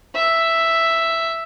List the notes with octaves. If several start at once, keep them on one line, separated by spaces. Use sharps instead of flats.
E5